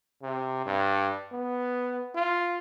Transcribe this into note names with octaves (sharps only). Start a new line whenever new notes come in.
C3
G2
B3
F4